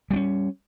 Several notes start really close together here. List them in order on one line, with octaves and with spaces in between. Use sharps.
G3 B3 C#4